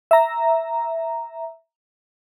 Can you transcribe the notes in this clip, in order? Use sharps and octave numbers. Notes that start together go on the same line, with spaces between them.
E5 A#5